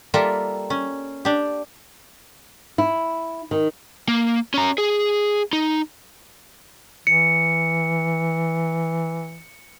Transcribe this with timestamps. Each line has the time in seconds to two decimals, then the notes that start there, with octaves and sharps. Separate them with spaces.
0.14 G3 A#3 F4 A4 A#4 E5
0.70 C#4
1.25 D4 G4
2.78 E4
3.51 D#3
4.08 A#3
4.54 C#4 A#5
4.78 G#4
5.53 D#4
7.07 E3 C#7